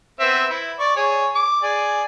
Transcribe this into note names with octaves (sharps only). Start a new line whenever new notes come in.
B3 C4 E5
E4
D5 C#6
G#4 C#5
D6
G#4 D5